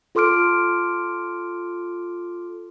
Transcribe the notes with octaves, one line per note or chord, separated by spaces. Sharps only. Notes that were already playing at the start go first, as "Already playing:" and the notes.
F4 A4 C6 D6 F6 D7